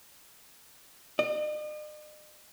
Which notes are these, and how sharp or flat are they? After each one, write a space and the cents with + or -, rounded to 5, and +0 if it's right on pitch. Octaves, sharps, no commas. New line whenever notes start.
D#5 -45